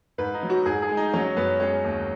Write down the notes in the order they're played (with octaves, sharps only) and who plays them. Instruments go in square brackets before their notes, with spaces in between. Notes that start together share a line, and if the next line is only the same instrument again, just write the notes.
[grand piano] G#2 B4
D#4
F#3
F#4
G#2 G#4
G#4
G#3
D#4
F#3 C#4
F#2 B3
G#3 C#4
D#2